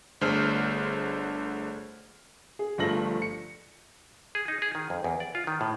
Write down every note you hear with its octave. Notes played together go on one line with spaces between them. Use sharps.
G1 D3 A3 G#4 C5 F6
G#4
G1 G2 F3 A3 A#6 F#7
C#7
G#4
D#4
G#4
D#3
F2
E2
D5
F4
D#3
A2